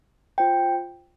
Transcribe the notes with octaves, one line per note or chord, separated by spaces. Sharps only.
F4 C5 G5